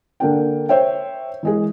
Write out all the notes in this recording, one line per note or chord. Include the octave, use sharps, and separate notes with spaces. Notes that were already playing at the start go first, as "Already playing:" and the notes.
D3 A#3 D4 G5
C5 C#5 E5 G5
E3 G#3 G#4